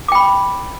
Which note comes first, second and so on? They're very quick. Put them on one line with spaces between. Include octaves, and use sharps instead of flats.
D6 G5 B5